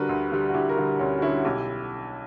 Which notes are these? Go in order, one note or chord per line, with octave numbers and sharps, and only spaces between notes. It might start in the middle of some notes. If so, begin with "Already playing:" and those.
Already playing: D3 G3 F#4 A#4 B4
D2
D3 G3
F#4
D2 E4 G4
F#4 A#4
D3 G3
D2 C#4
F#4
D3 G3 C#4 E4
B1 E4 G4